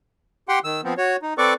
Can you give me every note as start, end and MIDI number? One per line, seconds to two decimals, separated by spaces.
0.49 0.59 67
0.49 0.59 78
0.49 0.59 79
0.49 0.59 84
0.64 0.81 51
0.64 0.81 88
0.84 0.94 53
0.84 0.94 59
0.84 0.94 60
0.98 1.16 66
0.98 1.16 73
1.23 1.34 63
1.38 1.54 60
1.38 1.54 69
1.38 1.54 71
1.38 1.54 74
1.38 1.54 85
1.38 1.54 86